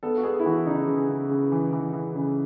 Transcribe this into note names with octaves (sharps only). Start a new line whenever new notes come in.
B3 A4
F#4
B3 G#4
E4
E3 F#4
C#3 D#4
C#3
C#3
C#3
E3
E3
E3
C#3